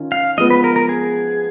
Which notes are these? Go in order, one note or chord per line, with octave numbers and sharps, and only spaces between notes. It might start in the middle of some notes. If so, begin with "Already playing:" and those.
Already playing: D#3 C#4 F4
F5
F3 G#3 B3 D#5
B4
A#4
A#4
G#4